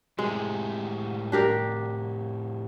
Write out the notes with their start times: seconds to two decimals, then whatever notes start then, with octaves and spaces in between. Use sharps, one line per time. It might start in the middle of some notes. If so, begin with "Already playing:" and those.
0.19 A2 C3 G#3
1.32 D4 G4 A#4